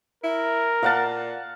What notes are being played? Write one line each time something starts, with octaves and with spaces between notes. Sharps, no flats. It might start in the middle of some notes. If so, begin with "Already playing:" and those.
E4 A#4
A#2 F5 F#5 A5